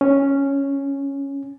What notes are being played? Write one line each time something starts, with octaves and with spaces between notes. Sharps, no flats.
C#4